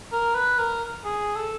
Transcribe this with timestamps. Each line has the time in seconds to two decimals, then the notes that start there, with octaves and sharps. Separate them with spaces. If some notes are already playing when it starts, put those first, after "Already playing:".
0.12 A#4
0.35 B4
0.59 A#4
1.05 G#4
1.36 A4